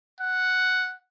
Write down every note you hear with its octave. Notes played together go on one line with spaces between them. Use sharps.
F#5